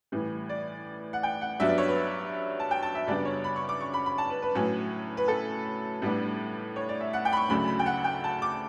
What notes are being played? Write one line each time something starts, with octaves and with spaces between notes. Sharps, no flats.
A2 E3 G3
D5
F#5
G5
F#5
G2 F#3 B3 D4 E5
D5
C#5
B4
A5
G5
A5
E5
F#2 C#3 G3 B3 D4 D5
C#5
B5
C#6
D6
C#6
B5
B5
A5
B4
B4
A2 F#3 C#4 B4
B4
A4
A2 G3 B3 D4
C#5
D5
E5
F#5
G5
B5
C#6
D2 C#3 F#3 A3 D4 B5
B5
G5
F#5
G5
A5
D6